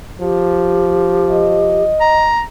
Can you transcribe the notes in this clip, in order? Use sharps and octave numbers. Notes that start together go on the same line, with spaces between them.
F3 G4
D#5
A#5